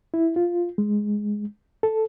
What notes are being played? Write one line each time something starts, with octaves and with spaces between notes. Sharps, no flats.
E4
F4
G#3
A4